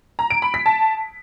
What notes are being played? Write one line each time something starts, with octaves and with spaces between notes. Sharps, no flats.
A#5
D7
B5
B6
A5